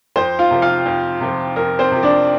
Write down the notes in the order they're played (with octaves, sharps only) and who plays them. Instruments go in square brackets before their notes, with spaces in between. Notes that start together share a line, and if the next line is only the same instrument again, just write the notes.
[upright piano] F2 C5 C6
F4 F5
C3 F3
F4 F5
F2
C3 F3
F2 A#4
C4 C5
C3 F3
D4 D5